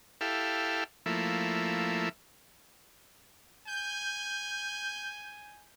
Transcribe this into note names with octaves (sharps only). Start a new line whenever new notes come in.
E4 G4 A4 F5
F3 A3 A#3 E4
G#5 G6